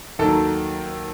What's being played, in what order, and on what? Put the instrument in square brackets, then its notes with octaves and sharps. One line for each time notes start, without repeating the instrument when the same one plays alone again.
[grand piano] D#2 D#3 F#3 A4